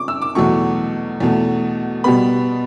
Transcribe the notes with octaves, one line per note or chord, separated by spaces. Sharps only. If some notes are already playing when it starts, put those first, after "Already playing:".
Already playing: C#6 D6
E6
D6
E2 B2 F#3 A3 C#6
E2 B2 A3
B2 G3 B3 B5